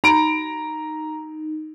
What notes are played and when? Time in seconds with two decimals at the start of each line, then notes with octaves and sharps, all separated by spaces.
0.04 D#4 A#5 D7